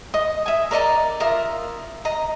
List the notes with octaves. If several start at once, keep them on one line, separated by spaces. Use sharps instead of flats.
D#5 D#6
E5 G#5
A#4 D5 D#5 A#5
F4 A#4 E5 D#6
D#5 A#5